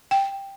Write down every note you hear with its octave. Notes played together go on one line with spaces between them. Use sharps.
G5